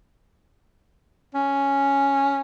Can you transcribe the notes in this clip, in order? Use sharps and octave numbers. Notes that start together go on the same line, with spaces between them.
C#4